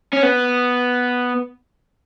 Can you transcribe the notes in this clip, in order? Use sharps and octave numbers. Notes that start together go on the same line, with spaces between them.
C#4
B3